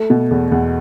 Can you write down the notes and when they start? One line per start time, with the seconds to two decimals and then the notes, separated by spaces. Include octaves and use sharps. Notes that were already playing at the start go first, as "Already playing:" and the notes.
Already playing: A3
0.10 B2
0.31 E2
0.52 E2